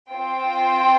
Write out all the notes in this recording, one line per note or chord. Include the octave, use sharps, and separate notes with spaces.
C4 F4 C5 G5